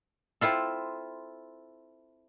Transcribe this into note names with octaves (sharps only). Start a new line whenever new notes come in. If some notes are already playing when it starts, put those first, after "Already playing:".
C4 E4 F4 A4